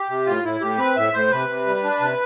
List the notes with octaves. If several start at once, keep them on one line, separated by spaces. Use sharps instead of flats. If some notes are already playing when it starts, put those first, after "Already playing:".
Already playing: G4
C3
A2 F4
A2 E4
A2 G4
C4 B4
A2 E5
A2 C5
C3 B4
C3
G3
D4
C3